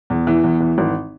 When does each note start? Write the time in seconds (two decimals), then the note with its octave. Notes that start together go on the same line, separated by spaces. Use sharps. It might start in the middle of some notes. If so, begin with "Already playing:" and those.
0.10 E2
0.27 E3
0.44 E2
0.60 E3
0.78 G#1